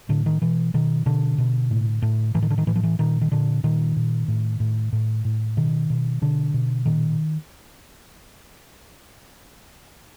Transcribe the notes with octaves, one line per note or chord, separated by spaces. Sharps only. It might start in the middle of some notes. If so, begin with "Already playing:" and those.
A2 D3
D#3
B2 E3
B2 D#3
B2 D3
B2
A2
A2
A2 E3
D#3
D3
D#3
A2 E3
F3
E3
A#2 D#3
D#3
A#2 D3
A#2 D#3
A#2
A2
A2
A2
A2
B2 D#3
B2
B2 D3
B2
A#2 D#3